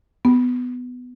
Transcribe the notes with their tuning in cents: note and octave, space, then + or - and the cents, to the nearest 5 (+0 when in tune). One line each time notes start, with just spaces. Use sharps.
B3 +10